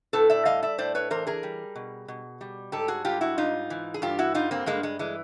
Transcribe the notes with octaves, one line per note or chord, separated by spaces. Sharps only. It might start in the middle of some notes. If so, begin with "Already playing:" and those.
A2 A4 B4
D5 E5
G3 D#5 F5
D5 E5
A2 C5 D5
B4 C#5
E3 A#4 C5
G#4 A#4
G3
B2
B2
G3
G#2 G4 A4
F#4 G#4
G3 F4 G4
E4 F#4
G#2 D#4 F4
E3
G#4
G2 F4 G4
E4 F#4
G3 D#4 F4
A#3 C4
G2 G#3 A#3
G#3
E3 G#3